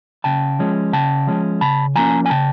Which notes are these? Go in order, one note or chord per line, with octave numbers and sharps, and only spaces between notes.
C#3 G5 A5
F3 G#3 C#4
C#3 G5 A5
F3 G#3 C#4
C#3 A5 B5
F3 A#3 C#4 G#5 A#5
G#5
C#3 G5 A5